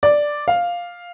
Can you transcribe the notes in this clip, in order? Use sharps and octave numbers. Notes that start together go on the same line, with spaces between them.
D5
F5